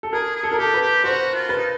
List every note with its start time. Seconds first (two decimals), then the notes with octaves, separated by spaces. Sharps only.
0.03 A4
0.13 G#4 A#4
0.35 G#4
0.43 A4
0.52 A#4
0.58 G4 A4
0.74 B4
0.82 G4
1.04 F#4 C5
1.34 F4
1.49 B4
1.57 D#4